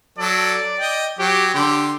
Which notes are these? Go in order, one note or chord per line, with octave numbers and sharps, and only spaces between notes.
F#3 A4 D5
D#5 G5
F#3 G4
D3 G4 C6